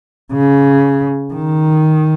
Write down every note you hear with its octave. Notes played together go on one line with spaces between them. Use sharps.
C#3
D#3